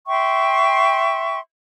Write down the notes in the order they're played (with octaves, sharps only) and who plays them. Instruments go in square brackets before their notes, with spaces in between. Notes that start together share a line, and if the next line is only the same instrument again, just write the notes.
[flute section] E5 G5 C6 C#6